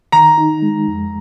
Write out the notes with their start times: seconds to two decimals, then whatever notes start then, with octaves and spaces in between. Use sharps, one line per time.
0.12 D#3 A#5
0.38 D#4
0.62 G#3
0.88 F2